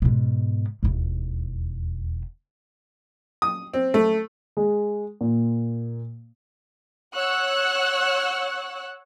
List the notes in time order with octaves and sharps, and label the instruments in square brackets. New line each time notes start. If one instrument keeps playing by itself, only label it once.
[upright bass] G#2 B2
E1 D#2
[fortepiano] D#6
C4
A3
[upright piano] G#3
A#2
[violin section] C#5 F#5 C#6 E6 F#6